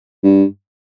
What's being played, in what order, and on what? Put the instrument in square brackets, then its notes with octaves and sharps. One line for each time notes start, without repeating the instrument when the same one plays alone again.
[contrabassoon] G2